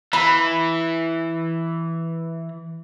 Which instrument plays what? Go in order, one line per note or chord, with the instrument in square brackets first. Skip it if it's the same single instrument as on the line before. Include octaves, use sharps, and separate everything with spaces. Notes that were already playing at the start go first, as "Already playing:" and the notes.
[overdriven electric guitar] E3 [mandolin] B5